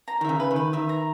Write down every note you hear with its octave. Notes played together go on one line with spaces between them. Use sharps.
A#5
D#3
C#3 E5
B4
D#3
B4
D#3 E5
A#5